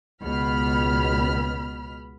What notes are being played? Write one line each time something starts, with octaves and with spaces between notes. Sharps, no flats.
C#2 B2 B5 F6